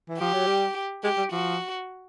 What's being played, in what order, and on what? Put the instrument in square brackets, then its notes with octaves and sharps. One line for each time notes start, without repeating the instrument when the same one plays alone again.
[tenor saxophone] E3
[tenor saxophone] F3 [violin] G4
[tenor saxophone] F#3
G3
[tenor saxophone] G#3 [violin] G4
[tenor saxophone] G3
[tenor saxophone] F3 [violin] F#4